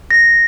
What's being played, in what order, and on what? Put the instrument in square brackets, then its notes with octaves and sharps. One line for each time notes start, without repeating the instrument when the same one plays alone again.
[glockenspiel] A#6